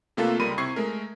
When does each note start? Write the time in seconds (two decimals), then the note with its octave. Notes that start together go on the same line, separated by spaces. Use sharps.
0.17 C3 A3 A#3 F4 A4 B4
0.39 C#2 G3 A#4 B5 C6 D#7
0.58 C3 E4 C#6 G#6 C7
0.76 G#3 A3 A#4